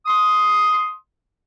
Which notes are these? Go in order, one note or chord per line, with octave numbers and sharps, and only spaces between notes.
C6 D#6